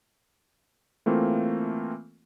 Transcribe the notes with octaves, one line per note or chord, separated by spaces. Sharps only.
E3 A3 A#3 C4 F4